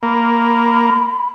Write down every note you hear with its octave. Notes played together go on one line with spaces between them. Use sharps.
A#3 B5